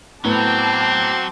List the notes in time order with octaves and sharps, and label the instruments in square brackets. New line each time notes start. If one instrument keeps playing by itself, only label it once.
[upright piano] A2 B3 [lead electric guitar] F#3 [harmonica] C4 [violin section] A5 D6